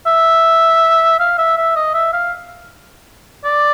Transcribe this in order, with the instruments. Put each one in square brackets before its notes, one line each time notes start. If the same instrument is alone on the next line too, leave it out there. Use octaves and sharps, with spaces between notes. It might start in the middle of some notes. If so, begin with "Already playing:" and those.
[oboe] E5
F5
E5
E5
D#5
E5
F5
D5